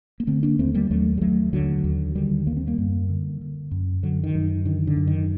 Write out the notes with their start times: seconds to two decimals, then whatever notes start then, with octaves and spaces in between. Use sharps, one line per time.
0.20 A#3
0.27 D3 A3 C4
0.43 A#3 D4
0.59 D#2 A3 C4
0.74 G3 A#3
0.91 D#2 F#3 A3
1.18 G3
1.21 D#2 F#3 A3
1.53 D#2 D3 F#3
1.84 D#2
2.15 D3 D#3 G3
2.47 D#2 A#3
2.57 C4
2.67 G3 A#3
2.78 F#2
3.09 D3
3.41 D3
3.71 F#2
4.03 F#2 D3 F#3
4.24 D#3
4.35 F#2
4.65 D3 D#3
4.87 D3
4.97 F#2
5.07 D#3